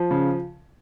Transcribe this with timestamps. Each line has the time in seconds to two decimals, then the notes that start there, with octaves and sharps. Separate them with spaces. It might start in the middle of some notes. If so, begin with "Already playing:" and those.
Already playing: F3
0.11 C#3